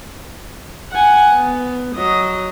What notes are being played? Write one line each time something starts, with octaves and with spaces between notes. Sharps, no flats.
F#5 G#5
B3
F#3 D#5